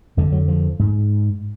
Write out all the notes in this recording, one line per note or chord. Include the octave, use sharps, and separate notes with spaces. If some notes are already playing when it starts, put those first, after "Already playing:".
F2 D3 G#3
F#3
F3
G#2